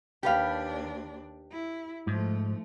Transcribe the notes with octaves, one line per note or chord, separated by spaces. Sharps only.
D#2 D4 G4 B4 F5
E4
G#2 F3 A3